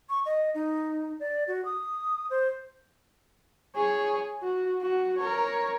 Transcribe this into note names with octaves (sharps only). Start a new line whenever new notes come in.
C#6
D#5
D#4
D5
F#4
D#6
C5
G#4 C#5
F#4
F#4
A#4 C#5